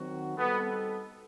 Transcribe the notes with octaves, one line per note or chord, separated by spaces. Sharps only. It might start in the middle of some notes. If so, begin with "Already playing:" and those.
Already playing: D#3 F#3 C4 F#4
G3 B3 C4 D#4 F#4 A4